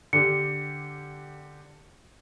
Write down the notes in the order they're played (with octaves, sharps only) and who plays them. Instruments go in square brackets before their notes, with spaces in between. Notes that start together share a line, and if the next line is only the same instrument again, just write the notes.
[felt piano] D3 G4 [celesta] C#7